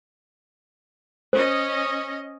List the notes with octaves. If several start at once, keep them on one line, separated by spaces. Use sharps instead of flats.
C#4 C5 D#5